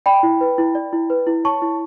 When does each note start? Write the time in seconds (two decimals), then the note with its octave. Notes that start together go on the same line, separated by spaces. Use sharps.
0.06 D5 G5 B5
0.23 E4
0.41 B4
0.58 E4
0.75 D5
0.93 E4
1.10 B4
1.27 E4
1.44 C#5 A5 C#6
1.62 E4